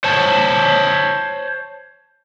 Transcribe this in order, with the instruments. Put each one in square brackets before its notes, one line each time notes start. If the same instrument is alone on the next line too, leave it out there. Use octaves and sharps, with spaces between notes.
[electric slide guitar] C5 C#5 A5